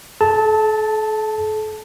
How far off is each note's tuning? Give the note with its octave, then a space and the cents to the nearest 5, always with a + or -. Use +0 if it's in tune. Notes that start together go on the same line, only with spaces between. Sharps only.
A4 -40 A5 +0